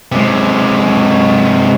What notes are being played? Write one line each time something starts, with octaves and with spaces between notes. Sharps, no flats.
C3 G#3